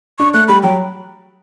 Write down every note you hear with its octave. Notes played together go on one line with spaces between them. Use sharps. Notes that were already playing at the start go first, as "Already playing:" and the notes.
D4 C#6
A3 F#6
G3 B5
F#3 G5